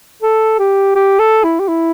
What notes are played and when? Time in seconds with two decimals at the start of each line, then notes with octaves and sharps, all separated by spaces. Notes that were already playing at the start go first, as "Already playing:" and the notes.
0.22 A4
0.59 G4
0.95 G4
1.19 A4
1.44 E4
1.60 G4
1.68 E4